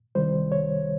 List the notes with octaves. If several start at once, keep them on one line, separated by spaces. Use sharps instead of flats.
C2 C3 D#3 G3 C5
C#5